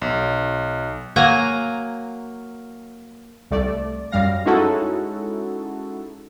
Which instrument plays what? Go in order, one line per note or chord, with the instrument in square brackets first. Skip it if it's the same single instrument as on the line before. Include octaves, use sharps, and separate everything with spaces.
[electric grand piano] B1
[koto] F#3 A#3 G#5 A#5
[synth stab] C2 A3 D5
F#2 G3 F5 A#6
G#3 C#4 D#4 E4 F#4 A4